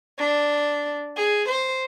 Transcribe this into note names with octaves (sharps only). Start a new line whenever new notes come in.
D4
G#4
C5